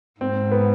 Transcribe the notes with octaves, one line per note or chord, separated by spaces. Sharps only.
G#2 C4
B3